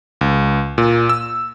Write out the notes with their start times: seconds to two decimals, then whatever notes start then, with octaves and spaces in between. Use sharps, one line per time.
0.21 C#2
0.78 A#2
1.09 E6